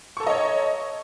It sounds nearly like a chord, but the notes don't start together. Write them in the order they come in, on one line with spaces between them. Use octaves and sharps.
C#6 A4 A#5 D#5 C#5